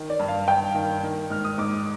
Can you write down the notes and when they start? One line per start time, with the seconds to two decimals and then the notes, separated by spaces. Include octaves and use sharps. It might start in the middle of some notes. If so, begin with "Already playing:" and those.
Already playing: D#3
0.10 D5
0.20 G2
0.28 F5
0.48 G2 G5
0.74 D#3
1.03 D#3
1.30 G#2 F6
1.45 D#6
1.58 G#2 D6